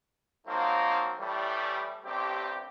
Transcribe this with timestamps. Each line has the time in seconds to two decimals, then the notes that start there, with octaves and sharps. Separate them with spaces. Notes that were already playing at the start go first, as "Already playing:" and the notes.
0.47 F3 F#3 A#3 C4 D#4
1.19 A2 E3 G3
2.05 A1 G2 C4 G4